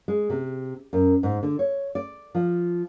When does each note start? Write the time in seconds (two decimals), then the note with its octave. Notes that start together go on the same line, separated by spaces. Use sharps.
0.08 G#3
0.30 C3
0.93 F#2
1.23 G#2
1.43 D3
1.59 C#5
1.95 D5
2.35 F3